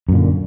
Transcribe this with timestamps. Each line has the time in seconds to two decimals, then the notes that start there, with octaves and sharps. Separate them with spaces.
0.09 F#2
0.12 A#2
0.15 D3